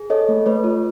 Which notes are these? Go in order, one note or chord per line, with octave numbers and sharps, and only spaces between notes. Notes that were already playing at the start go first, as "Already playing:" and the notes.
Already playing: G#4
A4 C#5 D#5
A3
A3 B4 C#5
F4